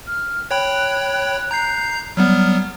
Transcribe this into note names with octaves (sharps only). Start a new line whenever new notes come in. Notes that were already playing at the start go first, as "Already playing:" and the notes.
F6
C#5 G5 B5 F#6
A#5 G6 C7
F#3 G3 B3 F6